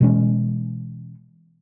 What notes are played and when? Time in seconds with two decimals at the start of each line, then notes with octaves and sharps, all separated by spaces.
0.01 B2 E3 G#3 C#4